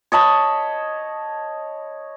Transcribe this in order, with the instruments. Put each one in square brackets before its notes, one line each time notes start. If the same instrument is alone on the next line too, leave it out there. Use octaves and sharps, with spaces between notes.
[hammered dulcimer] C#5 D#5 A5 B5